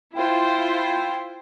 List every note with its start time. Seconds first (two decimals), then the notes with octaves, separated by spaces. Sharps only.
0.14 E4 F4 C5 G5